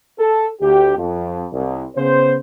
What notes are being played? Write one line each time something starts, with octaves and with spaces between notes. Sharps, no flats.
A4
D2 G4
F2
C2
C#3 B3 C5